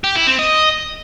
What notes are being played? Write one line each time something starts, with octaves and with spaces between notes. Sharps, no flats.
G4
E4
C4
D#5